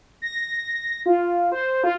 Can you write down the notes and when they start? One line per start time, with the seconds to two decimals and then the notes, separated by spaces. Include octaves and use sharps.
0.22 A#6
1.06 F4
1.52 C5
1.84 F4